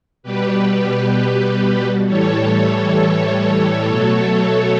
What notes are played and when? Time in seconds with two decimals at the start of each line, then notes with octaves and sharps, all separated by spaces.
0.23 B2 G3 G4 B4
2.05 A2 E3 G3 A4 C#5
3.88 B2 F#3 A3